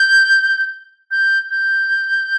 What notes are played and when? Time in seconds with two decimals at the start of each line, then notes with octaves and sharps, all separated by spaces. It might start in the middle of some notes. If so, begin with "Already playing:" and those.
Already playing: G6
1.11 G6
1.50 G6